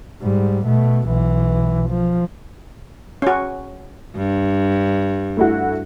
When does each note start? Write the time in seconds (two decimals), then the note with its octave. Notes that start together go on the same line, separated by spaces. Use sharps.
0.22 G#2 G3
0.65 B2 A3
1.08 B1 E3
1.90 F3
3.22 C#4 F#4
4.16 G2
5.37 A3 E4 F#4